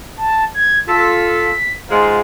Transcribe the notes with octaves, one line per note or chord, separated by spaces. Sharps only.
A5
G#6
F4 A4 B6
G#2 G#3 F4